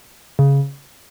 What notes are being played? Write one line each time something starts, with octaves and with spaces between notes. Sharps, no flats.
C#3